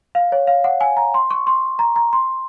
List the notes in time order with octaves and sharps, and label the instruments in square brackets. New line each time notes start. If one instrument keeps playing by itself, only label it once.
[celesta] F5
C#5
F5
F#5
G#5
A#5
C6
C#6
C6
A#5
A#5
C6